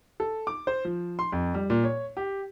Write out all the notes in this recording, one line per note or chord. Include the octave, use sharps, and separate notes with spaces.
A4
D6
C5
F3
C6
F2
G3
A#2
C#5
G4